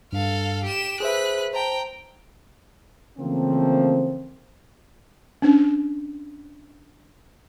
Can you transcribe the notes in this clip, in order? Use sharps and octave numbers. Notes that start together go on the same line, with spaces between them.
G2 A4 F5
G4 E7
G#4 B4 C5 E5 F#6
C5 G5 A5 A#5
C#3 E3 F3 A3 A#3 C4
C#4 D4